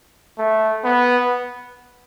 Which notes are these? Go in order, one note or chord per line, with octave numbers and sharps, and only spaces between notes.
A3
B3